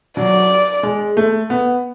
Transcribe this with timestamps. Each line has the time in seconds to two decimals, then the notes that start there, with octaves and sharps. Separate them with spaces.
0.17 F#3 D5
0.83 G#3
1.17 A3
1.50 B3